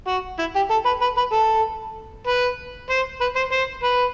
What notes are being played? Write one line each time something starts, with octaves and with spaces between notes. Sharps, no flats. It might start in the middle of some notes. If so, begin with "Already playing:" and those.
F#4
E4
G4
A4
B4
B4
B4
A4
B4
C5
B4
C5
C5
B4